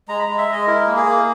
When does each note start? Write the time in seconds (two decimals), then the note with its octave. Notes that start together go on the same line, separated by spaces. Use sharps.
0.08 G#3 A#5
0.19 B5
0.23 G#3 A#5
0.38 E5
0.48 G#3 D#5
0.67 E4 A#4
0.87 A#3
0.96 G#4
1.06 A#3